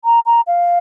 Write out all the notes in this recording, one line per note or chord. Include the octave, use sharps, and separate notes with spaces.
A#5
A#5
F5